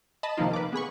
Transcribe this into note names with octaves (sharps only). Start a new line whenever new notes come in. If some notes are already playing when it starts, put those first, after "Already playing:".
D#5 A5 B5
C3 D#3 F3 A#3 D#4 F4
B4 D6
B3 G#4 B5 C#6